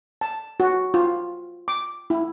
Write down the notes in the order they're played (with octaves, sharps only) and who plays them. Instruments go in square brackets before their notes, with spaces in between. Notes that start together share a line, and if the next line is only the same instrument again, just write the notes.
[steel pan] A5
F#4
F4
D6
E4